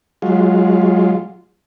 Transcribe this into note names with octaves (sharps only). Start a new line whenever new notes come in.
F#3 G#3 F4